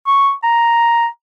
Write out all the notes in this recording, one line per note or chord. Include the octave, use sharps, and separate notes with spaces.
C#6
A#5